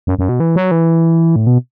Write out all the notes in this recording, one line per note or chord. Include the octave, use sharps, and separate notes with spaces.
F#2
F#2
B2
E3
F#3
E3
A2
B2